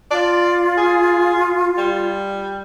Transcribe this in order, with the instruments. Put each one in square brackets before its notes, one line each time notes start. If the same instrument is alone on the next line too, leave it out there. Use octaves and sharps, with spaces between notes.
[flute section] F4 [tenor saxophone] D5
[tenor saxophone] G#4
G3